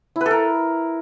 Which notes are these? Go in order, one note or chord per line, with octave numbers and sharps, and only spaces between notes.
E4
B4
A4
A#4